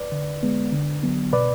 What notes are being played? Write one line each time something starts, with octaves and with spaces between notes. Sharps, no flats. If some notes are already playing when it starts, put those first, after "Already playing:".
Already playing: B4 D5
D3
G#3 B3
D3
F#3 B3
B2 B4 D5